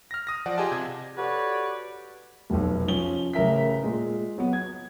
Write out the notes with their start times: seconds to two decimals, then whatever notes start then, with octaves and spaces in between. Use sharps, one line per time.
0.11 F6 A#6
0.27 D#6 A#6
0.46 F3 D5 F#5
0.58 F4 G4 G#4 D#5 G#5 A5
0.72 C3 G#6
1.18 F#4 G4 A4 B4 C#5 D5
2.50 F1 B1
2.88 F3 C#4 G7
3.33 A1 C#3 A#4 E5 B6
3.83 A#2 G#3
4.38 F#3 B3
4.53 G#6